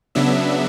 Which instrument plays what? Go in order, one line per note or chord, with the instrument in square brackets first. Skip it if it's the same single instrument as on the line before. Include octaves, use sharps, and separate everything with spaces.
[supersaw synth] C#3 F#3 B3 D4 E5